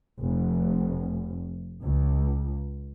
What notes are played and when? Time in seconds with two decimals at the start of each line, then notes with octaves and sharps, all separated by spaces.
0.19 F1
1.81 C#2